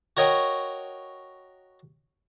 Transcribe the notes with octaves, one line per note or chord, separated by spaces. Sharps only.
F#4 A#4 C#5 D#5 G5